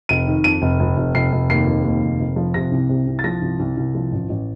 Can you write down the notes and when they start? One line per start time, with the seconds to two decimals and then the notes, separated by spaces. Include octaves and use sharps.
0.09 F1 D#7
0.27 D#3
0.44 F2 D#7
0.62 F1
0.80 F1
0.97 F1
1.14 F1 C7
1.32 F1
1.50 D#2 C7
1.66 F1
1.85 D#2
2.03 F1
2.19 F1
2.36 F3
2.54 C3 A#6
2.71 C2
2.89 C3
3.07 C2
3.19 A6
3.24 F3 A#6
3.42 C2
3.59 C2
3.77 C2
3.95 F3
4.12 A1
4.29 A1